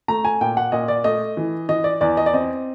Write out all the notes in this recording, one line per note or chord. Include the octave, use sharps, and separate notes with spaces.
A3 A#5
G#5
A#2 G5
F#5
A#2 D#5
D5
A3 D#5
E3
E3 D#5
D5
E2 D5
D#5
D5
C4 D#5